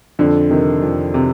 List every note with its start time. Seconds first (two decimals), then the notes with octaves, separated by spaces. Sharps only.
0.19 F2 D3
0.50 C3 D#3
0.82 F2
1.14 C3